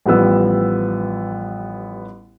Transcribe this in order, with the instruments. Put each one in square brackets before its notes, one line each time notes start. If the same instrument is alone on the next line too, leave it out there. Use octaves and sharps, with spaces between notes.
[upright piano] A1 F3 G3 B3 E6